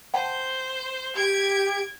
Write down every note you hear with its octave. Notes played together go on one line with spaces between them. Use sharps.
C5 F#5 G5 A5
G4 G#6 D7